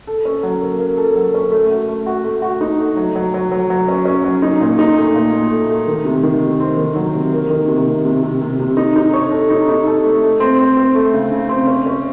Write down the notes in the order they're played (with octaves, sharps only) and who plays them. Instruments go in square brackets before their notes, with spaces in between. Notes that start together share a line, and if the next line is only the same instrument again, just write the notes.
[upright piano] A4
C#4
F#3
A#3
A#3
A4
F#3
C#4
A3
F#4
A3
F#4
A3
F#4
D#4
A3
F#3
F#3
F#3
F#3
F#3
C#4
C#4
F#3
D#4
A#2
D#4
A3
A#2
A#2
A3
A3
D#3
C3
D#3
C3
C4
D#3
F#3
C3
A#3
D#3
C3
C3
C3
C3
C3
C3
D#4
D#4
C#5
A4
D#4
D#4
A4
A3
A3
C4
C4
C4
A3
C#3
C#3
C4
C#4
C#4